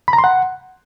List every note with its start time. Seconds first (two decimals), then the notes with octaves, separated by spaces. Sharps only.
0.08 B5
0.13 A#5
0.18 C6
0.24 F#5